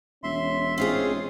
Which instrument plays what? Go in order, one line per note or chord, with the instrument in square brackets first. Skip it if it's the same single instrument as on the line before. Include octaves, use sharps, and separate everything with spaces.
[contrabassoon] E1 [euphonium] C#4 [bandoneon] E5 C6
[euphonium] C4 [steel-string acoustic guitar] C#4 D#4 G#4 [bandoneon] F4 F5